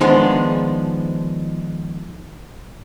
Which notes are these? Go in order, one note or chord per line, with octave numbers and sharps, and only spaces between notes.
D#3 F3 G#3 B3 D4